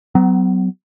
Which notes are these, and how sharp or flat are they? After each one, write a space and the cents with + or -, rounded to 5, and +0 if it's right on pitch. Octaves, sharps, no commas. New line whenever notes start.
F#3 +20 B3 +40